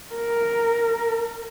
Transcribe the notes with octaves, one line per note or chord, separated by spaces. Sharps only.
A#4